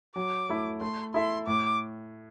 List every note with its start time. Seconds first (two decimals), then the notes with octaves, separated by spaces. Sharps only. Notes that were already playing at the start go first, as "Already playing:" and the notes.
0.16 F#3 D6
0.49 A3 E4
0.81 A3 C6
1.14 E4 A4 E5 C6
1.47 A2 D6